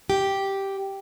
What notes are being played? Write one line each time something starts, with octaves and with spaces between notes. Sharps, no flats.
G4